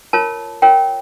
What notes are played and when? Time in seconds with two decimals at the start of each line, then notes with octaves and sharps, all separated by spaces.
0.13 F4 A#4 C#5 A5
0.62 F4 A#4 C#5 G5